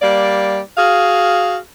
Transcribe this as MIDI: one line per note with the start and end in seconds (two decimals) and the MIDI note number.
0.01 0.59 55
0.01 0.59 58
0.01 0.59 74
0.76 1.57 66
0.76 1.57 68
0.76 1.57 77